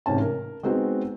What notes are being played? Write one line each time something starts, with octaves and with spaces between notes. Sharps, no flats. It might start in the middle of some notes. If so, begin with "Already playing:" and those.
A1 G#2 C3 C#4 A5
A#4
G#3 B3 C4 D#4 F#4